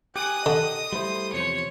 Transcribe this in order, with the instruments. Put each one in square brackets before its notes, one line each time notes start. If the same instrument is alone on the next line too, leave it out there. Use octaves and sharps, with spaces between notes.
[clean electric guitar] G4 [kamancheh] G#5 F#6 [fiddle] D#6
[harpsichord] D3 [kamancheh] D#5
[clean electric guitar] G3 A3 E4 [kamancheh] C5
[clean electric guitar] E2 C3 F3 [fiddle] C#5